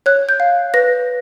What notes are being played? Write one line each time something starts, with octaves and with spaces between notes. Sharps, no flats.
C#5 F#6
G6
F5
B4 A#6